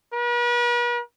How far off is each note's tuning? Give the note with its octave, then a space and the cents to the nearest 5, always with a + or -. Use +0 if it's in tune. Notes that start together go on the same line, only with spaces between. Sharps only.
B4 -45